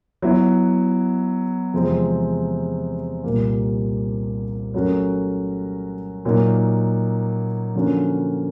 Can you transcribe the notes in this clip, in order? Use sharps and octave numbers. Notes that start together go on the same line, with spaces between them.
F#3 B3 E4
E2 C3 F3 G#3 C4
C2 A#2 G3 A#3
F#3 A3 C#4 F#4 A#4
A#2 F#3 A#3 D#4
D3 F3 A#3 C#4 F#4